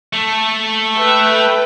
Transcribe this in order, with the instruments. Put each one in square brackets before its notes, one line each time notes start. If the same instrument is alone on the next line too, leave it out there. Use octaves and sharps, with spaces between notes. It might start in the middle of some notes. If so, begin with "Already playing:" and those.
[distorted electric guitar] A3
[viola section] A4 B4 G5 [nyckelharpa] E5